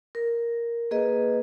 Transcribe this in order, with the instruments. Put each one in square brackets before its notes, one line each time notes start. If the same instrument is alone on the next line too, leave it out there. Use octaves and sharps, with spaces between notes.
[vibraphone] A#4
A#3 G#4 B4 D#5